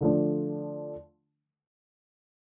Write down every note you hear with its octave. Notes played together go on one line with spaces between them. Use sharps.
D3 F3 A3 D4